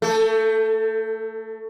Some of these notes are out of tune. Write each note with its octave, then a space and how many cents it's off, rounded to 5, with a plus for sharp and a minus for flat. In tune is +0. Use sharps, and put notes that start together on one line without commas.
A3 +30 A4 +0